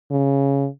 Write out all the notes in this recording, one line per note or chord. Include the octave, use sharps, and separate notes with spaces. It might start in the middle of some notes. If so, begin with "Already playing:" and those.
C#3